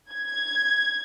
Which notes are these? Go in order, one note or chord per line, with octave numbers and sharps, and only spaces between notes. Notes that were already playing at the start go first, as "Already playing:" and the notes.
G#6